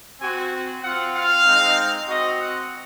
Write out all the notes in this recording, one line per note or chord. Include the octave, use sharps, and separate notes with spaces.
C4 F#4 G#5
C4 F4 F#5
F5
G#3 C4 D#4
C4 F#4 D#5
F#5